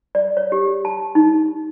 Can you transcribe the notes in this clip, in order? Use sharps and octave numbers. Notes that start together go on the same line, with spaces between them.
D5
C#5
G4
A5
D#4